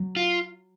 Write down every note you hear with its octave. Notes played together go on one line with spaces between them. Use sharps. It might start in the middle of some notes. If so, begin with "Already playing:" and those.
Already playing: F#3
F4